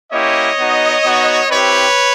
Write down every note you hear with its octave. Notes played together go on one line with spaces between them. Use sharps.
A#3 C#4 E4 G4 C#5 D#5
B3 D#4 F#4
B3 D#4 F#4
C4 E4 G4 B4 C#5